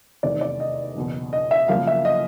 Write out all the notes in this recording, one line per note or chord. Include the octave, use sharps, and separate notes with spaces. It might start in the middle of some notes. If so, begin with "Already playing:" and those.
F1 E2 C3 D#3 D5
D5
D#5
F#1 E2 B2
D#5
E5
F#2 C#3 F3 A#3 F5
E5
D#5